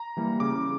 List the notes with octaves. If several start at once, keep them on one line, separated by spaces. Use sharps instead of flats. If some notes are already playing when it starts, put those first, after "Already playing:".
Already playing: A#5
E3 G3 A#3
C#3 D6